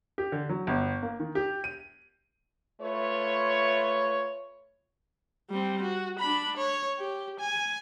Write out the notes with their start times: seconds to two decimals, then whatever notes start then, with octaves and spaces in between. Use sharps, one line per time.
0.18 G4
0.32 D3
0.49 F#3
0.67 G1
1.02 A#3
1.20 D#3
1.35 G4
1.64 D#7
2.82 A3 F4 B4 C#5
5.50 G3 C4
5.82 F#4
6.19 D4 B5
6.57 C#5
6.99 G4
7.40 G#5